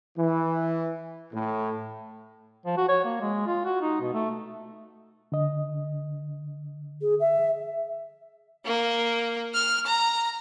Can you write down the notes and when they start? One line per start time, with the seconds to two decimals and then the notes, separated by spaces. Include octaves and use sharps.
0.17 E3
1.33 A2
2.65 F3
2.77 F#4
2.88 C#5
3.04 A#3
3.21 G#3
3.47 F4
3.65 F#4
3.82 D#4
4.01 B2
4.14 A3
5.32 D3 D#5
7.01 G#4
7.20 E5
8.65 A#3
9.55 F6
9.86 A#5